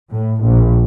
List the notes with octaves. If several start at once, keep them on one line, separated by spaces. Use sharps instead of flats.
A2
A#1